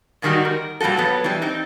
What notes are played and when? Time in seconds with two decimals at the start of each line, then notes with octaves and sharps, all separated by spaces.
0.22 G#2 D3 D#3 G3 D#4 F#4
0.45 A#4
0.80 A#2 G3 G#3 F#4 A4
0.97 F#3 B3
1.24 E3 G3
1.42 C4 D#4